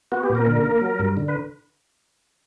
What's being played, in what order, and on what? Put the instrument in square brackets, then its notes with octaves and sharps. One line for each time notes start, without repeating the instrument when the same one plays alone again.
[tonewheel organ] B3 F#4
G4
A#2
A#4
D3
A#3
F#3
G2
D3
B4